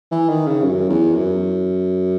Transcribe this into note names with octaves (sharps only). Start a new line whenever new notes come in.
E3
D#3
C#3
F#2
E2
F#2